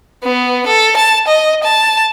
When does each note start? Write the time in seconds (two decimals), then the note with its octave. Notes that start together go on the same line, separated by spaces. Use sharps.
0.23 B3
0.67 A4
0.97 A5
1.28 D#5
1.64 A5